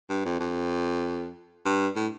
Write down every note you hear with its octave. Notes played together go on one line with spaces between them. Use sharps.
G2
F2
F2
G2
A2